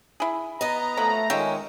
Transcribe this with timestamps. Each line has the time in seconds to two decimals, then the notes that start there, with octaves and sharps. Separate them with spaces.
0.20 E4 G#4
0.61 B3 D#5 A#5
0.97 F3 F#3 A3 B5
1.30 D#3 G#3 C#4 F4 E5 G5